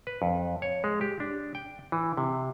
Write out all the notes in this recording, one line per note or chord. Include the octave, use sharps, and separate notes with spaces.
B4
F2
C#5
G#3
G4
D4
G5
E3
C3